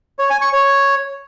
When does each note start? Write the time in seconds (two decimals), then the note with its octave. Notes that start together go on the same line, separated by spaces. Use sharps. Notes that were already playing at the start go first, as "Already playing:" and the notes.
0.19 C#5
0.30 G#5
0.41 C#6
0.53 C#5